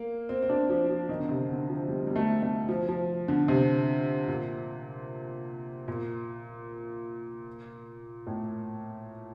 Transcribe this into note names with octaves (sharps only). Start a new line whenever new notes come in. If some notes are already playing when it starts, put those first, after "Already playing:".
Already playing: A#3
C4
C4
D4
F3
F3
D#3
D3
C3
D3
F3
G3
G3
A3
A3
F3
F3
D3
C3
A#2
A#2
A2